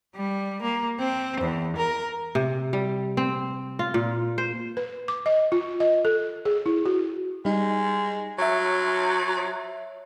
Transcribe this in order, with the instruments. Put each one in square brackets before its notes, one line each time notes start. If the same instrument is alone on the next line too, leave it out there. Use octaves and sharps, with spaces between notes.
[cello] G3
A#3
C4
E2
A#4
[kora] C3
G3
C4
F4
A#2
C5
[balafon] B4
D6
D#5
F4
D#5
A4
G#4
E4
F#4
[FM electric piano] G3 D#4 [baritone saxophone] G#3
[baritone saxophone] F#3 [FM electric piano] C#5 E5